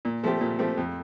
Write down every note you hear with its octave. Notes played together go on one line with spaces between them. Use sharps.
A#2
F3 A3 C4 G4
A#2
F3 A3 C4 G4
F2